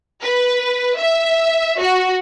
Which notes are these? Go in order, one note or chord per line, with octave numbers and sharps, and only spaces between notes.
B4
E5
F#4